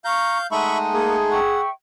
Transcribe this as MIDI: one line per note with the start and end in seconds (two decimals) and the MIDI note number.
0.05 0.47 77
0.05 0.38 82
0.05 0.36 85
0.05 0.47 91
0.51 1.40 56
0.51 1.40 57
0.51 1.40 63
0.51 0.78 76
0.51 1.18 78
0.51 0.78 83
0.51 0.78 85
0.51 1.18 87
0.93 1.16 58
0.93 1.61 68
1.31 1.69 76
1.31 1.61 78
1.31 1.69 79
1.31 1.69 85